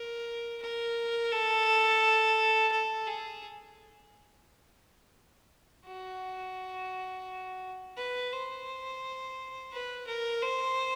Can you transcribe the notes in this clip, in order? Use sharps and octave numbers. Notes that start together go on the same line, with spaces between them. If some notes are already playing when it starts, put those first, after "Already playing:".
Already playing: A#4
A#4
A4
A4
G#4
F#4
B4
C5
B4
A#4
C5